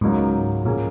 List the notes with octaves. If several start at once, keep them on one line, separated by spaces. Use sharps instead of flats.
C#2 G#2 C#3 F#3 A#3 D#4
A#2 F3 A#3 C#4 G#4